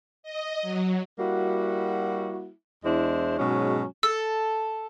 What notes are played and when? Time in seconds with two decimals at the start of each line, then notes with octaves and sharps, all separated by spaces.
0.23 D#5
0.62 F#3
1.19 G3 A#3 E4 F#4
2.84 E2 G#3 D4 E4 C5
3.39 G#2 B2 F#3 G#3 C#4
4.03 A4 E6